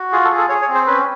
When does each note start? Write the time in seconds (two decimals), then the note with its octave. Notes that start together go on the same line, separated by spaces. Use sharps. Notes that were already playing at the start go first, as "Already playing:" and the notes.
Already playing: F#4
0.12 F4 G#4
0.25 A4
0.31 G#4
0.38 A4
0.49 G#4 C#5
0.62 C#5
0.68 C4
0.74 C5
0.87 C#4 B4